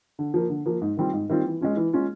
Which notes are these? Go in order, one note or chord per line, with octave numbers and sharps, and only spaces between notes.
D3
F3 A#3
D3
F3 A#3
G#2
D#3 G3 C4 F4
G#2
D#3 G3 C4 F4
E3
G#3 C#4 F4
E3
G#3 C#4 F4